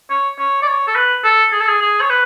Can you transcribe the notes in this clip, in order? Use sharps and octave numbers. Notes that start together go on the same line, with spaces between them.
C#5
C#5
D5
C#5
A4
B4
A4
G#4
A4
G#4
G#4
C#5
B4